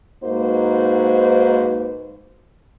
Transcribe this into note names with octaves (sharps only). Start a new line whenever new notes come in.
G#2 A#3 D#4 F#4 B4 C5